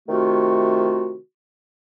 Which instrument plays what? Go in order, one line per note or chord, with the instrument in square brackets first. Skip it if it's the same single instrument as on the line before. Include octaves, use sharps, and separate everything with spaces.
[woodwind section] C3 D#3 A3 F4 F#4